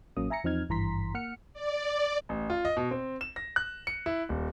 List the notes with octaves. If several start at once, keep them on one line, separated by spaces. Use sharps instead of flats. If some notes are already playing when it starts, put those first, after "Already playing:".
A1 F#3 A#3 C#4 D#6
E5 G#5 A#5 A#6 C#7
E2 F3 C4 D#4 F6 G#6
G#1 G2 E3 A#5 C6 B6
A#3 F#5 F6 C#7
D5
A1
F4
D#5
B2
C4
E7
A#6
F#6
C#7
E4
D#1